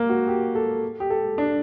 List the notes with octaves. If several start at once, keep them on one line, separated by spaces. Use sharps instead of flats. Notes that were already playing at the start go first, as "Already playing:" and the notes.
Already playing: A#3
F#4
G4
A4
G4
A4
D4